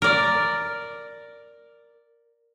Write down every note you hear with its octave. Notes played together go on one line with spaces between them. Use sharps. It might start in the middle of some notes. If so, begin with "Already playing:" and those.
A#4 D5